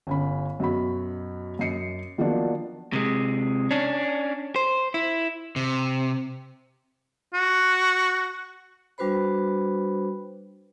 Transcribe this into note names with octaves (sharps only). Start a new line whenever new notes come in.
G1 C#4 B5
F#2 B2 F#4 B5
F#2 D#5 C7 C#7
D#3 F3 F#3 A#3 B3 D4
C3 G#3
C#4 D4
C5
E4
C3
F#4
G3 D4 F#4 B4 C5 B5